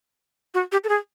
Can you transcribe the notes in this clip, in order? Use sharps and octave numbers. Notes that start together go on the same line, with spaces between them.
F#4
G4
A4
G#4